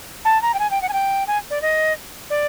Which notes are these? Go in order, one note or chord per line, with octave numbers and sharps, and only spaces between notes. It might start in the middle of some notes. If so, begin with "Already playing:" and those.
A5
A#5
G5
G#5
G5
F#5
G#5
G5
G#5
D5
D#5
D5